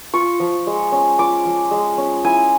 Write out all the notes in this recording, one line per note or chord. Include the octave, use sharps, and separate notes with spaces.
F4 C#6
F3
G#3
C#4
F4 D6
F3
G#3
C#4
E4 G#5